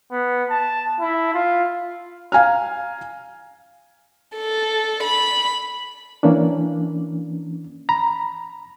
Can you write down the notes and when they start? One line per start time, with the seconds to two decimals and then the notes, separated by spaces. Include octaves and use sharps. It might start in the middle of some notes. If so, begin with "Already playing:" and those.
0.12 B3
0.50 A5
1.00 E4
1.34 F4
2.32 F5 G#5 A#5 F6
4.36 A4
5.03 B5
6.23 E3 A#3 C#4 D4
7.89 A#5 B5